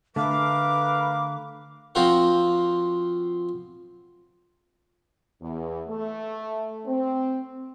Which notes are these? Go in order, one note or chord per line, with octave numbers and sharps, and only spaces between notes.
D3 A3 A#4 B4 F5 D6
F3 C4 F4 F#4 A#4
E2
A3
C4